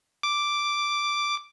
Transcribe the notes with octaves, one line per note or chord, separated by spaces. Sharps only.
D6